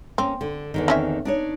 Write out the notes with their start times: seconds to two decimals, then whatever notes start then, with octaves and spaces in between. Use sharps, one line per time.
0.18 A#3 C4 C#4
0.41 D3
0.74 E2 D3 D#3
0.88 C4 C#4 E5
1.25 D4 D#4 C#5